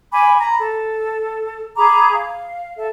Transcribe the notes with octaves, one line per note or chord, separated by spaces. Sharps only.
G#5 B5 D6
A#5 B5
A4
G#4 A#5 B5 D6
F5
A4 E5